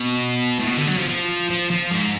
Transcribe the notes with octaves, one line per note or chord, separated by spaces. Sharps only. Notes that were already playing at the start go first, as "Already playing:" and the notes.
Already playing: B2
A2
B2
D3
F#3
F3
F3
F3
F3
G#2